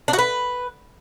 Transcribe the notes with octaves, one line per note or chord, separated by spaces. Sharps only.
D4
F#4
B4